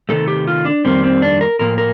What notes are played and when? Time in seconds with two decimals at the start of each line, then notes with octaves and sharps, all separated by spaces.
0.09 C3 D#3 A3 A4
0.28 G4
0.47 F4
0.65 D4
0.85 F2 D#3 G3 A#3 C4
1.04 C4
1.22 D4
1.41 A#4
1.59 A2 F3 A#3 A#4
1.78 A#4